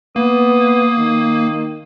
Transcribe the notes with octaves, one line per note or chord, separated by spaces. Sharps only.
A#3 B3 D#6
D#3